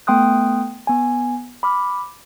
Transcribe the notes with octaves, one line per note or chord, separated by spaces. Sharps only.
A3 B3 G5 C6 D#6 F#6
B3 G#5
B5 D6 F6